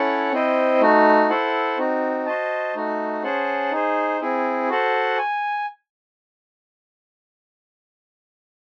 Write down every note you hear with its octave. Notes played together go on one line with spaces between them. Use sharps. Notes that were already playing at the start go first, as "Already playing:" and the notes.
Already playing: C#4 E4 A4 C#5 F#5
C4 E4 C5 D#5
A3 D#4 F#4
E4 A4 C5 F#5
C4 D#4 F#4
F#4 C5 D#5 A5
A3 D#4 F#4
C#4 G#4 C5 F#5 A5
D#4 G#4 C5
C4 E4 G#4
F#4 A4 C5 F#5
G#5